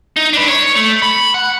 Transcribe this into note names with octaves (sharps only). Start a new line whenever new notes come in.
D#4
D4 B4
C#5
A3
B5
F#5